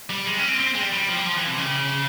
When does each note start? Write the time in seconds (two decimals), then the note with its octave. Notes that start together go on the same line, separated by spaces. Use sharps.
0.10 G3
0.26 G#3
0.38 C#4
0.48 C4
0.60 C4
0.74 G#3
0.82 G3
0.93 G3
1.08 F3
1.17 G3
1.26 F3
1.36 E3
1.47 C3
1.58 C#3